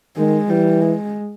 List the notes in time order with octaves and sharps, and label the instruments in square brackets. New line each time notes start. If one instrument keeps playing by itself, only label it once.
[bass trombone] D#3 [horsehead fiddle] G#3
[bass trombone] E3 [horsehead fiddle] G3
[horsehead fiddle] G#3